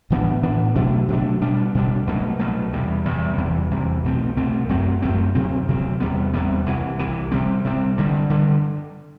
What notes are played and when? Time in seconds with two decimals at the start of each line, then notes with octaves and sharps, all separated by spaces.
0.10 A2 E3 B3 D4
0.43 A2 E3 B3 D4
0.75 B2 F#3 A3 D4
1.08 B2 F#3 A3 D4
1.42 B2 G3 D4
1.75 B2 G3 D4
2.07 C2 B2 F#3 A3
2.39 C2 B2 F#3 A3
2.73 E2 C3 G3
3.05 E2 C3 G3
3.38 E2 C3 E3 G3
3.71 E2 C3 E3 G3
4.04 C2 B2 A3 C4
4.37 C2 B2 A3 C4
4.69 F#2 F#3 A3 C4
5.02 F#2 F#3 A3 C4
5.35 D2 C3 F#3 C4
5.68 D2 C3 F#3 C4
6.00 E2 C3 G3 B3
6.33 E2 C3 G3 B3
6.66 C2 C3 E3
6.99 C2 C3 E3
7.31 C3 G3 C4
7.65 C3 G3 C4
7.97 G2 D3 G3
8.30 G2 D3 G3